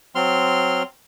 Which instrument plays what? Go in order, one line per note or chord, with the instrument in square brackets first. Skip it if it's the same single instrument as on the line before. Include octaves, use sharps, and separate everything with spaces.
[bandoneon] F#3 C4 C6 F6